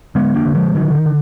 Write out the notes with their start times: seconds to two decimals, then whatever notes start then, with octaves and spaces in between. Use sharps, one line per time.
0.15 D3 G#3 B3
0.35 A#3 D4
0.46 D3
0.55 F3 G#3
0.75 D3 D#3 F#3
0.91 D3
0.95 D#3
1.06 D3